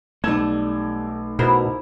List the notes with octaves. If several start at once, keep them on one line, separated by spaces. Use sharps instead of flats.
B1 G3 A3 A5 E6 G#6
B2 E4 A#4 C5